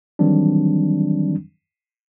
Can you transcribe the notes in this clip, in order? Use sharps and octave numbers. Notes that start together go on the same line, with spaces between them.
D#3 E3 F#3 G3 C4 D4